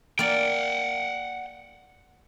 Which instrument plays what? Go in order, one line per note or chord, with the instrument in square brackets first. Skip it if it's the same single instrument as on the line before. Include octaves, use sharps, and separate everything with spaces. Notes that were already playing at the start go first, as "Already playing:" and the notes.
[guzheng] A#3 D5 [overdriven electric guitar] F#5 G5